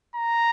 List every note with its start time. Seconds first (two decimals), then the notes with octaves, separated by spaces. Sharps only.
0.16 A#5